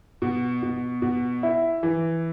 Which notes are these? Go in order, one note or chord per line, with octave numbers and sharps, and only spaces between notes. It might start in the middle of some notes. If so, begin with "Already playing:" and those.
B2
B2
B2
E4
E3